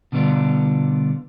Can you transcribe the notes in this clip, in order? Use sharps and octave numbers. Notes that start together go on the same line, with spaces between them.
B2 D3 G3 B3 D4 F4